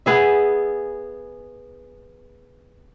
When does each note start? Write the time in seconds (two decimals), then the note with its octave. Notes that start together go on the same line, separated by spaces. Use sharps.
0.06 B3 G#4 E5